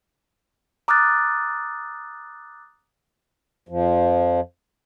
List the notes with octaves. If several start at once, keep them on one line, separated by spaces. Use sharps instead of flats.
A#5 D6 D#6 F6 F#6 A6
F2 F3